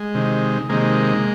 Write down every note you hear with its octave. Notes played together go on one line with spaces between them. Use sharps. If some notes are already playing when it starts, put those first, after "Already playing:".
Already playing: G#3
C3 D#3
C3 D#3 G#3 A#3